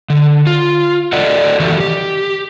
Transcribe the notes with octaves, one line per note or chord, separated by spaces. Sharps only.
D3
F4
F#4 A4 D5 D#5 F#5
D#3 E3 F#4 G4 A4
G4